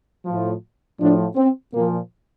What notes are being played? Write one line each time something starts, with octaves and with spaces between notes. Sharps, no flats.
A2 F3
A2 F3 D4
C4
A#2 F3 A#3